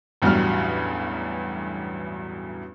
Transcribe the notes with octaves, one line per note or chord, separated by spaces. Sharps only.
A1 E2 G2 F#3 G3 F6